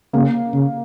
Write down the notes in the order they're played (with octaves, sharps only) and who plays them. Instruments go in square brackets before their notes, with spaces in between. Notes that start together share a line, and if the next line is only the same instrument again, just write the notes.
[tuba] C#3 [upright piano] A#3
[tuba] C#3